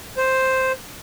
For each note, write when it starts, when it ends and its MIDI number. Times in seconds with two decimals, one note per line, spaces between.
0.17 0.72 72